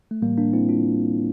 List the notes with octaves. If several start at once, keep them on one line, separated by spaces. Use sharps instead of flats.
A3
A2 E3 G3 A#3
A#3 D4
C4 E4
D4 F4